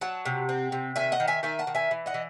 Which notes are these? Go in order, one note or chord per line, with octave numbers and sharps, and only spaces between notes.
F#3 F#5 A5
C3
C4
C3
D#3 E5 G#5
D#5 F#5
D#3
E5 G#5
D#3 E5 G#5
F#5 A5
D#3
E5 G#5
E3
D#5 F#5
E3